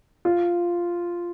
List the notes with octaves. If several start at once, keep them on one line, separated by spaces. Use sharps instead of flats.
F4